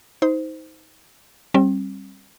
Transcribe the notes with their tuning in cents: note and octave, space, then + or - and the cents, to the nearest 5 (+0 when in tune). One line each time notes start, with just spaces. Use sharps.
D#4 +25 C5 -15
G3 -5 C4 +40